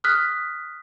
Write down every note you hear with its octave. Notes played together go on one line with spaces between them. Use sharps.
D#6 F6 F#6 B6